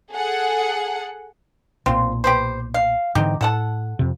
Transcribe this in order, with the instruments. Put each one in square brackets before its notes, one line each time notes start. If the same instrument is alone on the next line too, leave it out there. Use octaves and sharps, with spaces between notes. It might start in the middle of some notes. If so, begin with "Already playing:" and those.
[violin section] G#4 A4 F#5
[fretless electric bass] B1 A#2 [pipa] C4 F4
[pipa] G4 B4 C5
F5
[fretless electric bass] G#2 D3 E3 [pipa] C4 D#4 G4
[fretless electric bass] A2 [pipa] A4 F#5 A5
[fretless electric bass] F2 C3